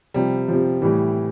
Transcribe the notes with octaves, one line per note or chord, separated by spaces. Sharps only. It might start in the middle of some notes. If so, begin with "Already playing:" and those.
C3 F3 G3
C3 F3
A2 E3 G3